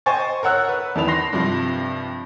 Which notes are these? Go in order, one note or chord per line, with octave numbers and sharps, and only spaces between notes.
C5 D#5 G5 G#5 C#6 A6
A#4 C#5 F#5 E6 F#6
B4
E2 D#3 E3 A5 B5 F7
B5 C6 A#6 C7
G2 C3 F3